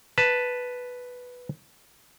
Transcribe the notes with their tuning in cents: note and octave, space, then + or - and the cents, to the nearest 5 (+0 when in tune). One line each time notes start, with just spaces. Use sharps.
B4 +0 A5 +0